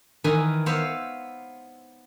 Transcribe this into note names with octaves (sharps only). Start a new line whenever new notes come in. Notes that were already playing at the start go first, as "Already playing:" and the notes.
D#3 E3 A#4 B4 G#5
B3 C5 C#5 E5 F5